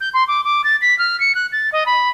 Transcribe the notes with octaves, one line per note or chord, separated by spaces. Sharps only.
G6
C6
D6
D6
A6
B6
F6
C#7
F#6
A6
D#5
B5